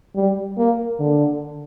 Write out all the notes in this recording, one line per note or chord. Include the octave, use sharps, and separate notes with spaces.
G3
A#3
D3